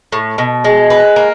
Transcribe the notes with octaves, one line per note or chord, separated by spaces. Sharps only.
A2
B2
G#3
B4
A#3